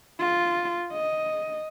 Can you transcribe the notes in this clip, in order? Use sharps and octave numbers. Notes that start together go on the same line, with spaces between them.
F4
D#5